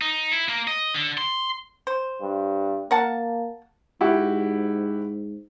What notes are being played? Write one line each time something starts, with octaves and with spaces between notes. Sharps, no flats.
D#4
E4
A#3
D#5
D3
C6
C5
G2
A#3 A#4 F#5 A5
G#2 E4 F#4 G4